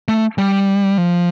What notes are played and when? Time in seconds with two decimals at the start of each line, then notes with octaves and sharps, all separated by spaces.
0.08 A3
0.38 G3
0.98 F3